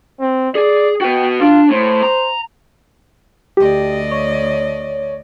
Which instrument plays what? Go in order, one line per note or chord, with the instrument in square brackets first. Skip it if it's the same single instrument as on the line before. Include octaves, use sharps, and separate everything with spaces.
[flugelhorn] C4
[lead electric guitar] G#4 [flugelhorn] D5
[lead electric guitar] F#4 B4 [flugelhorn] G5
[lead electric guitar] D4 [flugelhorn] F4
[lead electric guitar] A2 [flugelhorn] C5
[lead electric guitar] A#5
[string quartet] D2 D5 D#5 [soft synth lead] G4
[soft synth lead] C#5